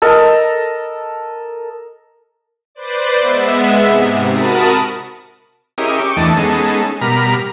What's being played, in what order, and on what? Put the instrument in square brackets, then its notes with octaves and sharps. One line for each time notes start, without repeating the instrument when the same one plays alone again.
[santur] A4 A#4 D#5
[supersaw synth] B4 C5 D5
G#3 B3 E5
G#2 C3
F#4 A#4 A5 B5 D#6
[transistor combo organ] C#4 E4 G4 G#4 A#4 D#5
G5 C#6 D6
E2 E3 A3 D4 D#5 A5
G#3 B3 C#4 D#4 G#4 A4
B2 G3 A#4 A#5 B5 F6